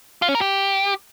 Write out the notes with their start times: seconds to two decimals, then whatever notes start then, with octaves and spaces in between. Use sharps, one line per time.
0.22 F4
0.28 C#4
0.35 A#4
0.41 G4